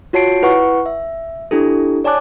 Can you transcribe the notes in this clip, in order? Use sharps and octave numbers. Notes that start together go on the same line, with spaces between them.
F4 F#4 C#5 A5 C7 D7
E4 B4 F#5 C#6
E5
D4 E4 G4 A4
C#5 D5 G#5 A5 D6 F#6